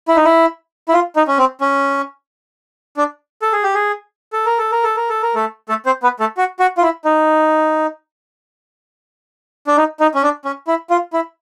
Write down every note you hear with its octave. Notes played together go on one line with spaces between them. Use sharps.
E4
D#4
E4
E4
F4
D#4
C#4
C4
C#4
D4
A4
G#4
G4
G#4
A4
A#4
A4
A#4
A4
A#4
A4
A#4
A3 A4
A3 A4
C4 C5
B3 B4
A3 A4
F#4
F#4
F4
E4
D#4
D4
D#4
D#4
C#4
D4
C#4
E4
F4
E4